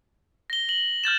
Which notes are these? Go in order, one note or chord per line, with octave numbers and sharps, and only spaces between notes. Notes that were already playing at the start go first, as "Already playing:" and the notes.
A#6 G7
F#7
F6 G6 A6 E7